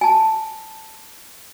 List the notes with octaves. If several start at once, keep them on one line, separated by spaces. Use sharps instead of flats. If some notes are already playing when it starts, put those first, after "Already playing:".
G#5 A5